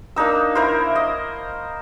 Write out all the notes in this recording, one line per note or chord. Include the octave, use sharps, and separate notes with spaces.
A#3 D4 D#4 E6
E4 A#4 C5
D#5